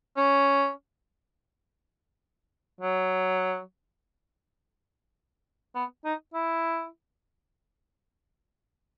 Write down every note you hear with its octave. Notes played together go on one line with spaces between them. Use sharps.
C#4
F#3
B3
D#4
E4